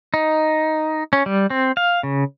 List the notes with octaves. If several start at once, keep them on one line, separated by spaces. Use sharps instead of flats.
D#4
C#4
G3
C4
F5
C#3